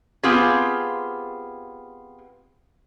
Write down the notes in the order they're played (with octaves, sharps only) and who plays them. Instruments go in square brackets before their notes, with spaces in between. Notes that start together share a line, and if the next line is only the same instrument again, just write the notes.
[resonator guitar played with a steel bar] B3 C4 F4 G4 G#4